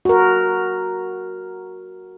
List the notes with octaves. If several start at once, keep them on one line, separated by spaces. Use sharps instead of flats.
F#4 A#4